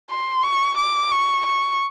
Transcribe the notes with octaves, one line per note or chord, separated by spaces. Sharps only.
C6
C#6
D6
C#6
C#6